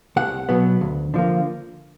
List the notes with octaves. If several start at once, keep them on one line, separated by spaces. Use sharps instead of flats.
C2 F#5
B2 F#3 B3
D2
D3 F3 A#3